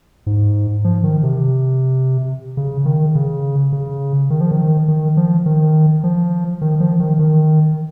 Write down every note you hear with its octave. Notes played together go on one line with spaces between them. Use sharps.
G#2
F3
D#3
C3
C#3
D#3
C#3
C#3
D#3
F3
D#3
D#3
F3
D#3
F3
D#3
F3
D#3
D#3